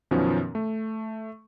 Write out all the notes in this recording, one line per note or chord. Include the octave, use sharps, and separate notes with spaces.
F#2 B2 D#3 F3 B3 C#4
A3